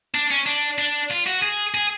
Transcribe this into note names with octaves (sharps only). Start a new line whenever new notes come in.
D4
C#4
D4
D4
F4
F#4
G#4
G#4